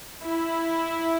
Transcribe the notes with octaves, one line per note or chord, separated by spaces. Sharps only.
E4